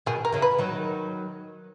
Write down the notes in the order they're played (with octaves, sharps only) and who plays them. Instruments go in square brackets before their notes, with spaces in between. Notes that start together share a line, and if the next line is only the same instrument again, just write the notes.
[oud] B2 D#3 [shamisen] G#4
[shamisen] A#4
[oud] C#3 E3
[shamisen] B4
[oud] D#3 F#3